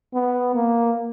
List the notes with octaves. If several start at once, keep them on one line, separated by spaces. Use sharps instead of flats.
B3
A#3